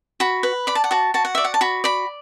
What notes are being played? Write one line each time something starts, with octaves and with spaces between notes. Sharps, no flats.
F#4 B5
B4
D5 B5
A5
F#5
F#4 A5
F#4 A5
F#5
D5 E5
F#5
A5
F#4 B5
D5 B5